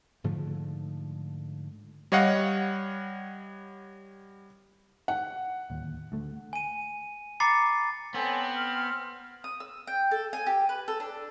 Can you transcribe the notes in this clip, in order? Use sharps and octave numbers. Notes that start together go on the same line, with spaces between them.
G#2 D3 F3 A3
G3 C#5 D#5 F5 F#5
F#5
D1 D#2
D2 A3
G#5 D#7
A#5 B5 D6 A6 C7 C#7
B3 C4 A4 C#5 G#5
F6
D#6
E6
G5
A4
G#5
G4
B4
A4
D4